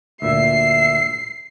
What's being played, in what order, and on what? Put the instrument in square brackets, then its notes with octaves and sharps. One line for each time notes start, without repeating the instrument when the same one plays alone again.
[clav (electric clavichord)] D2 A#2 [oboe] E5 [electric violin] C7